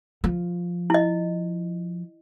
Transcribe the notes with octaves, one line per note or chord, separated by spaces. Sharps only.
F3
E4 D#5